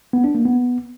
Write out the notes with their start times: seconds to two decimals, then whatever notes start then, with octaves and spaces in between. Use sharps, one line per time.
0.13 B3
0.24 D4
0.35 A#3
0.45 B3